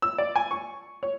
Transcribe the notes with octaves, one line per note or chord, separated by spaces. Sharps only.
E6
D5
G#5
C#6
C#5